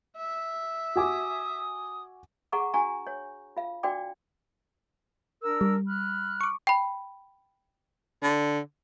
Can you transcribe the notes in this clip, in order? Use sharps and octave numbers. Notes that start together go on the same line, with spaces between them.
E5
F#4 G#5 D6 D#6
G#4 F#5 A#5 C#6 D6
D4 F#4 G#5 A#5 C#6
C#5
F4 F5
D4 F#4 D5 G5 D6
D4 A#4 E6
G3
B5 F6 F#6
C#6 D6
G5 B5
D3